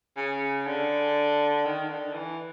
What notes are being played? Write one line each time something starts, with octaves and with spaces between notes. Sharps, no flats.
C#3
D3
D#3
D3
E3